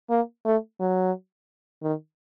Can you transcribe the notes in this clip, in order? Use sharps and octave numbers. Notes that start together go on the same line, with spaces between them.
A#3
A3
F#3
D#3